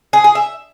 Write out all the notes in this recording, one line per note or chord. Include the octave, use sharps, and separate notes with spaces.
G#4
G#4
E5